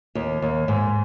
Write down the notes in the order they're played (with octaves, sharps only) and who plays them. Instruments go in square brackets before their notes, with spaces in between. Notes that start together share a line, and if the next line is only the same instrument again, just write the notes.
[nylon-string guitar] D#2
D#2
G#2